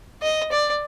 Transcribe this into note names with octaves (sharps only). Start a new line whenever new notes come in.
D#5
D5